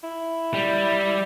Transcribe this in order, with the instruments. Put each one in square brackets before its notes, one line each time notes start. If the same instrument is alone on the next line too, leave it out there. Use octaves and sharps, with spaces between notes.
[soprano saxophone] E4
[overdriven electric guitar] G3